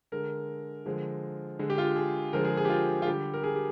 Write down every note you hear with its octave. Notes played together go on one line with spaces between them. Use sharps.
D3 G#3 A#4
D3 F3 G#3
D3 G#3
G4
F4
G#4
D3 F3 G#3 A#4
G#4
G#4
G4
F4
F4
D3 G3 G4
A#4
G#4
G4